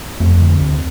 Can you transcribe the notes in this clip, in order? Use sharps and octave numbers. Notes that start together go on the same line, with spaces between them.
F2 A3 C4
D3
D2